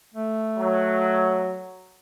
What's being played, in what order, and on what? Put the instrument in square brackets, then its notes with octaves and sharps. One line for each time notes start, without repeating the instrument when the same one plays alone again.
[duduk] A3
[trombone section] F#3